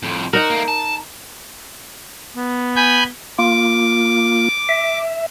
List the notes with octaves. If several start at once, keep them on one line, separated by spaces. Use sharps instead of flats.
F2 A2
D#4 F#4 A#4
A3 A#3
A5
B3
G#5 B5 G6
A#3 F4 D6
E5